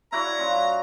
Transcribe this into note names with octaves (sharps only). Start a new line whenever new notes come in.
E4 F#4 D5 A#5
F#2 F4